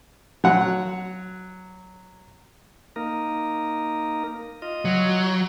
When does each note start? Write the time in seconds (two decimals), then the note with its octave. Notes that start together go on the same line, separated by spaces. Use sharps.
0.44 F#3 F#5
2.96 A#3 D#4 A#4
4.62 F4 D#5
4.85 F#3